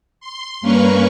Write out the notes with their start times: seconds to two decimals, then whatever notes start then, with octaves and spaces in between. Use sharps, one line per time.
0.20 C6
0.61 G2 A#3 C#4 A#4 B4 C#6